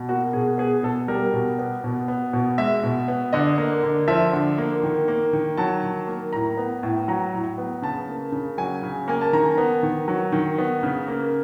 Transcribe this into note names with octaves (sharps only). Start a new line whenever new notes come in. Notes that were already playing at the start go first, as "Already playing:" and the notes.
Already playing: B2
A#3 F#4
B2 G#4
B3 G#4
B2 A4
G3 A#4
B2
B3
B2
B3
B2
G#3 E5
B2
B3
D3 D#5
A#3
D3
F3 E5
D3
A#3
D#3
A#3
D#3
F#3 A5
D#3
A#3
A2 A#5
B3
A2
F#3 A#5
A2
B3
C#3 A5
A#3
C#3
F#3 G#5
C#3
A#3 G#5
A5
D#3 A#5
B3
D#3
F#3
D#3
B3
C#3
A#3